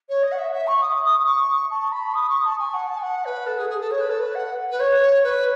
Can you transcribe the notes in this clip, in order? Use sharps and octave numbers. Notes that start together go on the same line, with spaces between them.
C#5
D#5
F#5
E5
E5
C#6
D#6
D#6
D#6
C#6
A5
B5
D#6
C#6
A5
G#5
F#5
A5
G#5
F#5
B4
A4
G#4
G#4
A4
C#5
B4
A4
B4
F#5
B4
C#5
B4